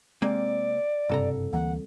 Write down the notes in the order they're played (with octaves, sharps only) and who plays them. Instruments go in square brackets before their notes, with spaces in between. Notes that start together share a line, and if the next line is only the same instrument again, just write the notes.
[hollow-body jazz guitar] C3 A#3 C4 [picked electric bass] G#3 [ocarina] D5
[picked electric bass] F#1 G2 C3 [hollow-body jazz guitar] C2 A4 A#5
[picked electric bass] D2 E3 A#3 [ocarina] F#5